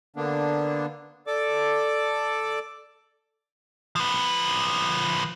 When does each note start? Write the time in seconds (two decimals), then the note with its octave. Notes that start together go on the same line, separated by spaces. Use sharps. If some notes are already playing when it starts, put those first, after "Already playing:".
0.16 D3 A#3 B3 D4
1.27 A4 D5 D6
3.96 F3 B4